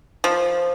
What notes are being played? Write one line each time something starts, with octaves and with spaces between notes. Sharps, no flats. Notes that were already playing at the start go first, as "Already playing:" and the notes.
F3